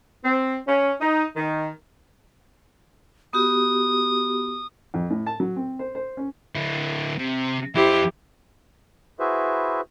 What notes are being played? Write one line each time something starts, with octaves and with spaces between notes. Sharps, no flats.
C4
C#4
D#4
D#3
B3 F#4 G4 D#6
F2
A2
A5
F#3
C4
C5
C5
C#4
D3 E4
C3
F2 E4 G4 C5
E4 F#4 G#4 B4 C5 E5